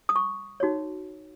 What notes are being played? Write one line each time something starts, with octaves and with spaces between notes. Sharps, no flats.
D#6
C#6
D#4 F#4 C#5